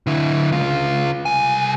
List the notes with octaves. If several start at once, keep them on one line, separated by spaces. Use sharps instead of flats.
D3 E4
C#2 F4
C2 G#5